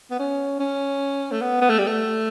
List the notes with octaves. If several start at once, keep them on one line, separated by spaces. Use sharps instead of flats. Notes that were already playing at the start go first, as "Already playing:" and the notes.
B3
C#4
C#4
A3
B3
B3
A3
G3
A3